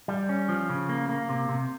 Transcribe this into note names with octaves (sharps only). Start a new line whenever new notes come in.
G3
C#4
F3
C#3
A#3
A#3
C3
C3